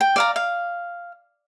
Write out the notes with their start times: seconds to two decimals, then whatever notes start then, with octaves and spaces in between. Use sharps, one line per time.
0.01 G5
0.16 D5 F5 A#5
0.36 F5